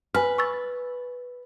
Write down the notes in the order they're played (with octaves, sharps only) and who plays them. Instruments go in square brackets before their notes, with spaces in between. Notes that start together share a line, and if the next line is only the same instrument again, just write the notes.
[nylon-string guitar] B4 [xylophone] G#5 F6
[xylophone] C#6 E6 A6